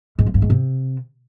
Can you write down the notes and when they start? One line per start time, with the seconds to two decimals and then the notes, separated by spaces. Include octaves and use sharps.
0.19 G#2
0.26 F3
0.34 G2
0.42 G#2
0.50 C3